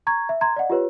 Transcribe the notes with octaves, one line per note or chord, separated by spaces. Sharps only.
A#5 C#6 G#6
E5
A#5 C6 G#6
D5 D#5 F#5
F4 G4 B4 C#5